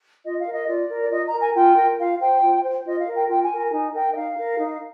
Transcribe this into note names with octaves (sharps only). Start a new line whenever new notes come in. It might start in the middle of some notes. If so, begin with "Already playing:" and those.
F4 D#5
F5
A#4
D#5
F4 D5
A#4
D5
F4 D#5
A#5
A#4
G#5
F4 G5
A#4
F4 F5
C5 G5
F4
C5
F4 D#5
F5
A#4
G5
F4 G5
G#5
A#4
G#5
D#4 G#5
A#4 G5
D#5
D#4 F5
A#4
D#4